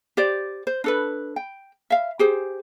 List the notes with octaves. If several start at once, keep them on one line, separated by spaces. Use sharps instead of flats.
G4 C5 D5
C5
D4 A4 B4
G5
E5 F5
G4 G#4 C5